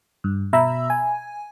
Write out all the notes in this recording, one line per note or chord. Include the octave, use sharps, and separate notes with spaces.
G2
B2 E5 A#5 B5 E6
G#5